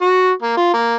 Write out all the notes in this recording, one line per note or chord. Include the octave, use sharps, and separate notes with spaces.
F#4
A#3
F4
A#3